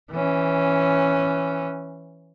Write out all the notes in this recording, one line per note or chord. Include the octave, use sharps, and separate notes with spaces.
E3 C#4